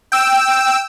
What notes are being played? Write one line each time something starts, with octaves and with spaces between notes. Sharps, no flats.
G5 E6